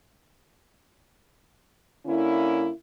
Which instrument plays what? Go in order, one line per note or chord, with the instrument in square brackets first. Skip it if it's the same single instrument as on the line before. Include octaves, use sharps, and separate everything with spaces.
[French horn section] D3 A#3 C#4 E4